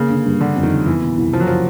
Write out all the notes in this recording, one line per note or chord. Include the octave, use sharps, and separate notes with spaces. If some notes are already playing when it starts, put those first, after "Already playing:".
Already playing: C#3 A#3
D3
G2
D3 G3
F2
D#3
F#1
E3 B3
B2
C2
F#1 F3
F#3
F3